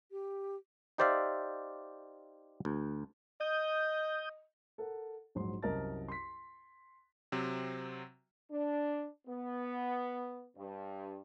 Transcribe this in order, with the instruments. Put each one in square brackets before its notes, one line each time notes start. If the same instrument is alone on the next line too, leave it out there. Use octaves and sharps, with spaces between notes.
[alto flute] G4
[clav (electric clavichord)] D#4 G4 C5 D5 E5 F5
D2
[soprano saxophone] D#5 [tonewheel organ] D#6 G6
[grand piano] A4 A#4 F#5
A#1 G#2 F#3 C6
C2 F#2 A#4 D#5 A5 A6
C6 B6
[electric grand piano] C3 F#3 C4
[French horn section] D4
B3
G2